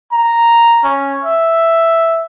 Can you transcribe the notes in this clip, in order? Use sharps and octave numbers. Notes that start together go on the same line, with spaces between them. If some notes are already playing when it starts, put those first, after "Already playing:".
A#5
C#4
E5